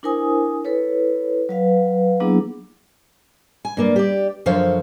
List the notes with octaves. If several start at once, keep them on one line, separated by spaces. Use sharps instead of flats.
D4 E4 A#4 C5 G#5 D#6
E4 A4 B4 C#5
F#3 B4 F5
F#3 A#3 B3 D4 E4 G#4
G#5
G2 A#3 D5
G4 D5
F#2 D3 F3 C5 C#5 F5